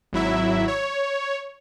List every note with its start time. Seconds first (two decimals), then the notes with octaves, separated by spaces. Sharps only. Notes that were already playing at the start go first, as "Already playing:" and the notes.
0.13 G#1 F#3 E4 E5
0.68 C#5